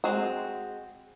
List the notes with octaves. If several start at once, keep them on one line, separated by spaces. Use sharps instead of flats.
G#3 C4 F#4